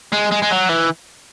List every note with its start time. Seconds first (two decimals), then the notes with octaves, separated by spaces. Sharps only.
0.13 G#3
0.32 G#3
0.43 G#3
0.51 F#3
0.70 E3